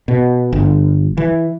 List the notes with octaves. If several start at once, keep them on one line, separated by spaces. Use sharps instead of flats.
B2
G1
E3